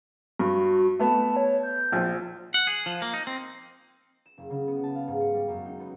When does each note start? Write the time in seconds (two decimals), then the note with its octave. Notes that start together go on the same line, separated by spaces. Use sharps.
0.39 G2 F#4
0.99 A3 B3 A5
1.37 C#5
1.63 G6
1.92 A#1 F3
2.54 F#5
2.67 G#4
2.86 F3
3.02 A#3
3.14 D#4
3.27 C4
4.26 E7
4.37 F#1
4.50 C#3
4.67 B3
4.83 A5
4.95 F5
5.07 G#2
5.20 C#5
5.33 G3
5.48 F#2
5.65 D#4
5.80 B3